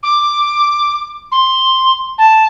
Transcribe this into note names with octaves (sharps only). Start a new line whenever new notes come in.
D6
C6
A5